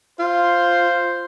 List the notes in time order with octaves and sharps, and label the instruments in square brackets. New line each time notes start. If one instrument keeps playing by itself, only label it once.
[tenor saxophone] F4 [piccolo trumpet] C5